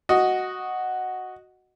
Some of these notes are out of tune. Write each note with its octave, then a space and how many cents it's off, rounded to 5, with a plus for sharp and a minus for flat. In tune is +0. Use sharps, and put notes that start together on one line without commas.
F#4 +0 D#5 +0